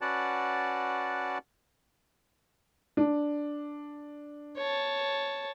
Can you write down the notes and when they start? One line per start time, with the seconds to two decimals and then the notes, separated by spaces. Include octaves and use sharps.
0.01 C#4 F#4 B4 D5 F#5 A5
2.97 D4
4.57 C#5 A5